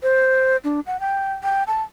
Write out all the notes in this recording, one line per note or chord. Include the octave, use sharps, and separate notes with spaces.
C5
D4
F#5
G5
G5
A5